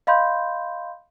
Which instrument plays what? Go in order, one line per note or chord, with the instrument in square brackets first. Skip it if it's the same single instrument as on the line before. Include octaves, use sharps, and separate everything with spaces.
[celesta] D#5 F5 B5 C6 G6